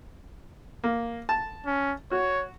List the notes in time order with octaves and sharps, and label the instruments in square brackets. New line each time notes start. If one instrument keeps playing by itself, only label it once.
[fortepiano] A#3
A5
[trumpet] C#4
[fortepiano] F#4 [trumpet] C#5